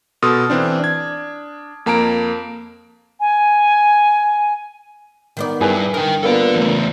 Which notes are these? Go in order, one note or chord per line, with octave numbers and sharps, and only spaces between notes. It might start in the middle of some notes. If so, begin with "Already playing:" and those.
B2 A4 C6 D#6 F6
E3 C4 D4
D4 G#6
F2 A#3 A5 A#5 D7
G#5
D#3 B3 D5
G2 E4 G#4 B4
G2 A#4 G5
A#3 B3 F4 A4 D5
E2 A3